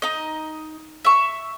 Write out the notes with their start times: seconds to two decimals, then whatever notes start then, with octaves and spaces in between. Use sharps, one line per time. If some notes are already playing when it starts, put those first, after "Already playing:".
0.02 D#4 D#5
1.05 E5 C#6